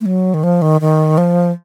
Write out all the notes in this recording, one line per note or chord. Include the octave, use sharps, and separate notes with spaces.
A3
F#3
D#3
F3
D#3
D#3
F3